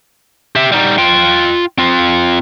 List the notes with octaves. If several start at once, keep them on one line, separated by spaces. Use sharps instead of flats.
G4 E5
G3 D#4
F4 G5
C4 F4